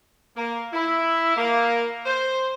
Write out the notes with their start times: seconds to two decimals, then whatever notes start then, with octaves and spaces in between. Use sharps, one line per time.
0.37 A#3
0.73 E4
1.37 A#3
2.06 C5